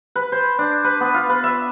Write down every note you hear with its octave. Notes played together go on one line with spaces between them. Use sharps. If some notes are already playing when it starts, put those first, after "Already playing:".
B4
C5
D4
B4
B3
F4
B4
E5